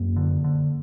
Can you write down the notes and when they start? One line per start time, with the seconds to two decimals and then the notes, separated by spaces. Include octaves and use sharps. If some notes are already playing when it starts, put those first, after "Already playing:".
Already playing: F#2 A#3
0.16 D3
0.44 D3